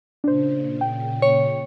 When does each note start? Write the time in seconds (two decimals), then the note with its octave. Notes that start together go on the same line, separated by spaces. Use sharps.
0.24 A#2 C#3 D4 C5
0.81 G5
1.22 C#5